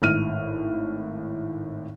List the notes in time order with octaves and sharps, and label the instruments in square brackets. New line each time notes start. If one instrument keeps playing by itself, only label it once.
[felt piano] G#1 A2 F6 D#7